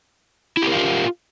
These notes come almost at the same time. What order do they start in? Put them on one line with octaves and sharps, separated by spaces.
E4 G4 A#4 F5 F4